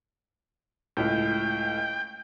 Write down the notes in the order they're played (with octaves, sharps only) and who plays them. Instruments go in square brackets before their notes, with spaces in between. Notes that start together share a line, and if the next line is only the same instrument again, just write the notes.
[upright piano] C#2 A2 [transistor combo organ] G5